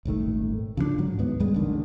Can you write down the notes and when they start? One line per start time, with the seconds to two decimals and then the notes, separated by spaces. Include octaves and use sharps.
0.05 D#1 G#1 D#3 A3
0.77 C#3 F3 G3 D4
0.98 G#2 D3 F#3
1.19 D#2 G#2 B3
1.40 D#2 G3 G#3
1.54 A1 D#2 D3 D#3